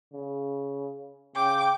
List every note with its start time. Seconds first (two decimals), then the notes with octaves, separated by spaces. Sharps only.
0.13 C#3
1.36 C#3 G5 D6